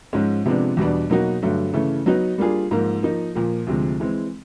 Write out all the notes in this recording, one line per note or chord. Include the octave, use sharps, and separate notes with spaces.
G#2 F3 G#3 C#4
C3 F3 G#3 B3 D4
E2 B2 G3 B3 D4
B2 F#3 A#3 D#4 F#4
G2 D3 F#3 A3
C#3 E3 A3
F#3 B3 D#4 F#4
G3 A#3 D4 F4 G#4
G#2 F3 A#3
F3 A#3 D#4
A#2 F3 A#3
D2 C3 F3 G#3
E3 G#3 C4